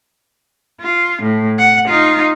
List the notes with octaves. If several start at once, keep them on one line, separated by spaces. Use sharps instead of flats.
F4
A2
F#5
D#4 F4